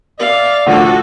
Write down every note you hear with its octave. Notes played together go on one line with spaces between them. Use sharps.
D5 E5 F5
A2 D3 F3 F#4 A4 F#5